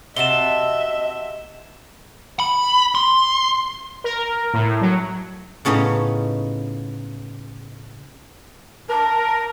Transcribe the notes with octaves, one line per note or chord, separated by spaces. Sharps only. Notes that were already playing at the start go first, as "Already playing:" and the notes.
C3 F#4 D#5 E5 A5 E7 G7
B5
C6
A#4
A2
F#3
A2 C#3 B3 C#4 D#4
A#4 A5